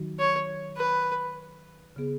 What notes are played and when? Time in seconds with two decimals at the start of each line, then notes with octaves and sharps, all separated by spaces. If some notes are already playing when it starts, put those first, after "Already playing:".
Already playing: D#3 F#3 D#4 F#4
0.19 C#5
0.77 B4
1.96 C#3 B3 G#4